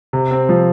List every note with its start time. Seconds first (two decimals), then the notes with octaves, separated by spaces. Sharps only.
0.13 C3
0.31 C4
0.49 F3